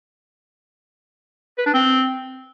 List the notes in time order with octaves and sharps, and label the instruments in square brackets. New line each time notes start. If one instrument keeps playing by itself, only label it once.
[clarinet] B4
D4
C4